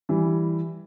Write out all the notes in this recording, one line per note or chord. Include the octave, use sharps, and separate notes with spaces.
E3 G3